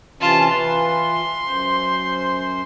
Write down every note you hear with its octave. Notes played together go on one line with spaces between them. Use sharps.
C3 E3 C#4 F4 A5
E3 F4 B4 C6
F#2 C5